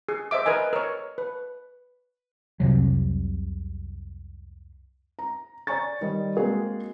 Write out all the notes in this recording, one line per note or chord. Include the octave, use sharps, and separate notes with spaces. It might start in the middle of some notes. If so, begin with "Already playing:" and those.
G#4
C5 D#5 E5 D6
A#4 B4 D#5 G#5
A#4 C#5
B4
C2 F2 C3 F#3
A#5
C#5 D5 G#5 A#5 C#6 A6
D#3 G3 C5 D#5
G#3 A#3 C4 F#4 G#4